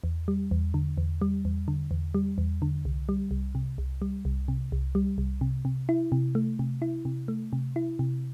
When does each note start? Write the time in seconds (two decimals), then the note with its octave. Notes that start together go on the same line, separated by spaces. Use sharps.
0.04 E2
0.28 G3
0.51 E2
0.74 D3
0.98 E2
1.22 G3
1.45 E2
1.68 D3
1.91 E2
2.14 G3
2.38 E2
2.62 D3
2.85 C2
3.09 G3
3.31 C2
3.55 C3
3.78 C2
4.02 G3
4.25 C2
4.48 C3
4.72 C2
4.95 G3
5.18 C2
5.41 C3
5.65 C3
5.89 E4
6.12 C3
6.35 A3
6.59 C3
6.82 E4
7.05 C3
7.28 A3
7.53 C3
7.76 E4
7.99 C3